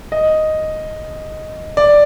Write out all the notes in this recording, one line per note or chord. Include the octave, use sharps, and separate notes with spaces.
D#5
D5